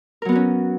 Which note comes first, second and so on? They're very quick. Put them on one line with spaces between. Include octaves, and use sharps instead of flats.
A#4 F#3 B3 F#4 C#4